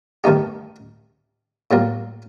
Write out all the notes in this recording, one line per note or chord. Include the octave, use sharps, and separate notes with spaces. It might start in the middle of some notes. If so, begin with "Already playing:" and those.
G2 D#3 A3 D#4 G4
A2 G3 A#3 F4